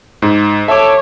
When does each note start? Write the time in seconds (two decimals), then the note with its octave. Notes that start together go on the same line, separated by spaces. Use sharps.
0.22 G#2
0.68 A4 C#5 E5 D6